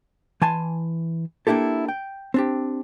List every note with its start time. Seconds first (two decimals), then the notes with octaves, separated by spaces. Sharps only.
0.42 E3 G#5 A5 C6
1.47 A#3 D4 E4 G4 A4
1.88 G5
2.34 C4 D4 G4